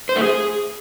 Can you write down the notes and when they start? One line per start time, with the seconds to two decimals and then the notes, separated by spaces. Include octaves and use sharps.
0.09 C5
0.16 A3
0.23 G#4